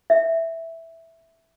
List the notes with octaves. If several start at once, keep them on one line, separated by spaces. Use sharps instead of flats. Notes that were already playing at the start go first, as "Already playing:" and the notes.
E5